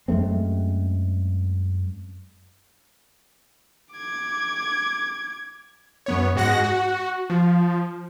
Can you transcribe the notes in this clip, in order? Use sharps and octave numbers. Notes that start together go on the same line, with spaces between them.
F#2 G#3 A3 C4
D6 G#6
F#2 B3 C#5
G#2 G#3 F#4 F#5 A#6
F#4
F3